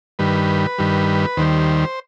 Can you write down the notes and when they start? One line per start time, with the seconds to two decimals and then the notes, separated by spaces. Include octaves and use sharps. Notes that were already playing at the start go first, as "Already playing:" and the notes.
0.19 G2 D#3 G3 B4
0.78 G2 D#3 G3
1.37 D#2 D#3 G3 C5